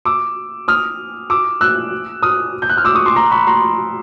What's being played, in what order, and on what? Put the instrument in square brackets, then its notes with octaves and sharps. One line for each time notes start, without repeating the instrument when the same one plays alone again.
[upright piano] D6 E6
D#6 F6
D6 E6
E6 F#6
D#6 F6
G6
F#6
F6
D6 E6
C#6 D#6
C6 D6
A#5 C6
B5 C#6
A#5 C6